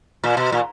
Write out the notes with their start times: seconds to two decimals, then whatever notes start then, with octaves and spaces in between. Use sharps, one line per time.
0.24 A#2
0.37 B2
0.52 A#2